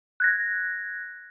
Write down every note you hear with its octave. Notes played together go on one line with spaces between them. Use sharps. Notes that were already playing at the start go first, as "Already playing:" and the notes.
F#6 G#6 A#6